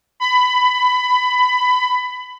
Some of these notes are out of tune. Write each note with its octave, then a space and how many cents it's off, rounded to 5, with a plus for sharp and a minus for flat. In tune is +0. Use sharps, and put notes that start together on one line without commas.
B5 +20